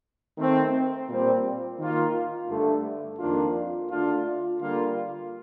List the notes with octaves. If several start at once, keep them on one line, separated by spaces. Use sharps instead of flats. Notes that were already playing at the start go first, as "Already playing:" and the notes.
D#3 A3 C4
A#2 G3 C4
D#3 A#3 F4
G2 D3 A3
F2 D#3 A#3 D4 F4
D3 A3 D4 F4
D3 G3 A#3 F4